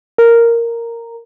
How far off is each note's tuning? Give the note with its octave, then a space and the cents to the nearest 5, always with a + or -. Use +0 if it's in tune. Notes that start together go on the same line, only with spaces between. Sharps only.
A#4 -5